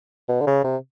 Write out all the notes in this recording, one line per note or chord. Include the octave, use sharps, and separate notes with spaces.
B2
D3
C#3
C3